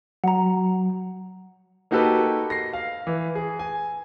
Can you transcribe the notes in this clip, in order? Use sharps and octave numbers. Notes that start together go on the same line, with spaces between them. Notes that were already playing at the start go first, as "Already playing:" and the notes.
F#3 F#5 A#5
A#3 D#4 F#4 G4 A4 B4
A#6 C7
F5
E3
G#4
G#5